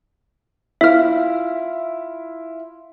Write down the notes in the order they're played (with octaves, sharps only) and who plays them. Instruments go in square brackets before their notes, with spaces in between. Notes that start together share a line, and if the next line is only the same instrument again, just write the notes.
[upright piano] E4 F4 [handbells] E5 F6